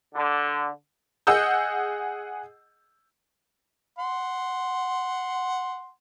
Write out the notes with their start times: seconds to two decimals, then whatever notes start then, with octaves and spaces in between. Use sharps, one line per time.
0.15 D3
1.27 G#4 D#5 F#5 D#6 E6 G6
3.99 F#5 C6